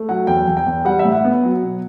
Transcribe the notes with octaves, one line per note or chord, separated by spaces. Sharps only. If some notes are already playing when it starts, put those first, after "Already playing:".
Already playing: A3
F#3 F#5
E2 G5
E2
G5
E2
G3 F#5
E5
A2
F#5
B3
F#3
B2